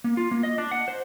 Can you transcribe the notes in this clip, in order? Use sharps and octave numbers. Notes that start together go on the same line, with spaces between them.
A#3
F4
A#3
D#5
D4
F#5
C5